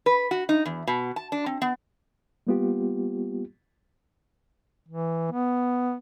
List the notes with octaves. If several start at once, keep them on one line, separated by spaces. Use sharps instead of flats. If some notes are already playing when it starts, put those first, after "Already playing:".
B4
F#4
D#4
E2
B2
A5
D4
C4
B3
G3 A#3 B3 F4 G4
E3
B3